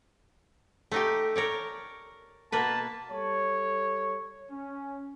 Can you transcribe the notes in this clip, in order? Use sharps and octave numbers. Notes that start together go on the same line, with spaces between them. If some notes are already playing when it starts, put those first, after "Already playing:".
A3 D#4 G4
A#4 C#5 D5
B2 A#3 B4 A5
G3 A4 C#5
C#4